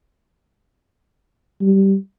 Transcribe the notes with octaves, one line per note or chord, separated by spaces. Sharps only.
G3